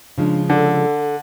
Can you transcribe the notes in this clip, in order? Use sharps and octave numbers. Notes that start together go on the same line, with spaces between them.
C#3 F3 G#3 D4
D3 A4